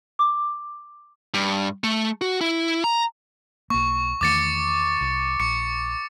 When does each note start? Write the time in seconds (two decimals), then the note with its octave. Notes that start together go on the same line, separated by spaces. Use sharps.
0.19 D6
1.34 G2
1.84 A3
2.21 F#4
2.41 E4
2.84 A#5
3.70 B1 A#3 C#6
4.21 E2 D#3 A3 D6 A6 C#7
5.01 C2
5.40 A#1 C#6 C#7